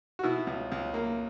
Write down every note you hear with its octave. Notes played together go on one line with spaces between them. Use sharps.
F#4
B2 E4
C#2
C#2
A#3